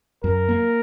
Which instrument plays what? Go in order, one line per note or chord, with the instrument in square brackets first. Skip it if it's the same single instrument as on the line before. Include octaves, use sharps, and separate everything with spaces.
[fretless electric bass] F#2 [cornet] A#4
[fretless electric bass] A#3